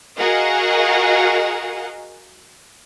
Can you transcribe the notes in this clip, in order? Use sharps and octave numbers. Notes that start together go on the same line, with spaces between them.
F#4 G#4 A#4 D#5 F5 F#5